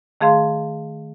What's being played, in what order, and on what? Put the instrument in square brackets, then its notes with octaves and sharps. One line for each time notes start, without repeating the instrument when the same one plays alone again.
[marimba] D#3 A3 G#4 F5 C6